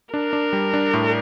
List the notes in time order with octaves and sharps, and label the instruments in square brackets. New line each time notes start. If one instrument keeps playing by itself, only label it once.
[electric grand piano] D4 [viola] A#4
[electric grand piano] D4
G3
D4
A2